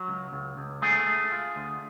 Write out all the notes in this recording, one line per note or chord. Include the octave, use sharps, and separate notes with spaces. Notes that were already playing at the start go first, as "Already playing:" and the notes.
Already playing: F#3
C#2
C#2
C#2
A3 G#4
A3
F4
D2